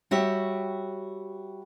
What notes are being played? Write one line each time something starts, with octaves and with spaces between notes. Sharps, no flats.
G3 F#4 G4 C#5 E5